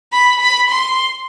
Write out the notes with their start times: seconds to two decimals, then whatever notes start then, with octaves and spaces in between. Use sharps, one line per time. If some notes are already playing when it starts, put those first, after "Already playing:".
0.13 B5
0.40 B5
0.70 C6